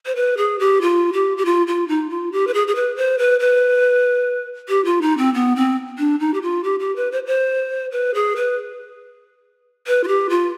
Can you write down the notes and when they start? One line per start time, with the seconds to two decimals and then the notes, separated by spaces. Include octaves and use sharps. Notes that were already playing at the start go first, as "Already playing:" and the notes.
0.06 C5
0.16 B4
0.37 G#4
0.59 G4
0.81 F4
1.13 G4
1.37 G4
1.45 F4
1.67 F4
1.88 D#4
2.10 F4
2.32 G4
2.47 B4
2.54 G#4
2.67 G#4
2.75 B4
2.96 C5
3.19 B4
3.40 B4
4.69 G4
4.85 F4
5.02 D#4
5.17 C4
5.34 B3
5.56 C4
5.98 D4
6.20 D#4
6.34 G4
6.42 F4
6.64 G4
6.80 G4
6.96 B4
7.12 C5
7.26 C5
7.92 B4
8.14 G#4
8.36 B4
9.87 B4
10.04 F4
10.08 G4
10.29 F4